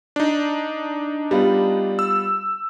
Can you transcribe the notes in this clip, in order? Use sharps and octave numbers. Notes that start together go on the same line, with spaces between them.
D4 D#4
G3 B3 F4
E6